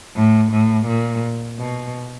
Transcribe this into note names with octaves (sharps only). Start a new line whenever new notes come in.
A2
A2
A#2
B2